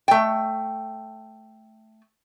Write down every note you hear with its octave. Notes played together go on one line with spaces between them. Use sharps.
A3 G5